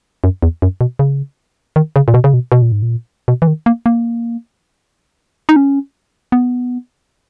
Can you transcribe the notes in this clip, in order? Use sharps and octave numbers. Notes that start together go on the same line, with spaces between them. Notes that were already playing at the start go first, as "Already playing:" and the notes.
F#2
E2
F#2
B2
C#3
D#3
C#3
A#2
B2
C#3
B2
B2
A#2
G#2
A#2
B2
E3
D#3
A#3
A#3
D#4
C#4
B3